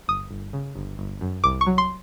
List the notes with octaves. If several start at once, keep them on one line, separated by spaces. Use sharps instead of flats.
G1 D#6
G1
C#3
G1
G1
F#2
C2 D6
C#6
F#3
C6